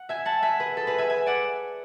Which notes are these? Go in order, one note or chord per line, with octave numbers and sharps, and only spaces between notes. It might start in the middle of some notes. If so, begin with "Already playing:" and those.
Already playing: F#5
E5 G#5
F#5 A5
E5 G#5
G#4 B4
A4
G#4 B4
E5 G#5
E5 G#5
D5 F#5